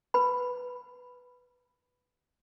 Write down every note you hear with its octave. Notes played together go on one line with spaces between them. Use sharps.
B4 B5